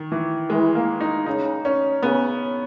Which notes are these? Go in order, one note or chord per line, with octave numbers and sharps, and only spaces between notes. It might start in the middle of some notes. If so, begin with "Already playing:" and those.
Already playing: D#3
E3
E3 G#3
A#3
D#4
C#3 D#4
C#4
C#3 B3